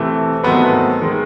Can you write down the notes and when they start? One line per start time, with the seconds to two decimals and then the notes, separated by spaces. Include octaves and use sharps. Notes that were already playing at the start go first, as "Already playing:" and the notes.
Already playing: C3 E3 A3
0.43 G#2 D#3 F#3 A3 B3 C4 B4
1.02 D#3 G#3